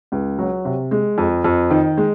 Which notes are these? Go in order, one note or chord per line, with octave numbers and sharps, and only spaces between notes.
C#2
F#3
C3
G#3
F2
F2
D#3
G#3